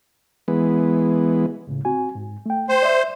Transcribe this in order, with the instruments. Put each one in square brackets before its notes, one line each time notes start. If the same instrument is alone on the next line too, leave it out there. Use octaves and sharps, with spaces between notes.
[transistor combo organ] E3 G#3 B3
[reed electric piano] C#2 A2 C#3
C4 F#4 G#5
G#2
A3 G5
[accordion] C5 [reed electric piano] G5
[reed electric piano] D5 E5